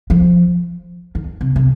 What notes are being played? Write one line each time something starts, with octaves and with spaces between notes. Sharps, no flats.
F3
D#3
C3
C3